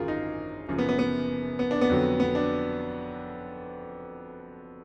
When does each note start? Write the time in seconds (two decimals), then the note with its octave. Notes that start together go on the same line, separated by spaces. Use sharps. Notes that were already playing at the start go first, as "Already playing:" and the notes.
Already playing: G#1 F#2 D3 F#3 F4 G#4 A#4
0.08 D#4
0.69 F#1 F#2 F3
0.78 B3
0.89 B3
0.99 B3
1.59 B3
1.71 D4
1.81 B3
1.90 F2 D3 F#3
2.20 B3
2.35 D4